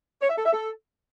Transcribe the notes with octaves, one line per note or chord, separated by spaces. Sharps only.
C#5
E5
A4
E5
A4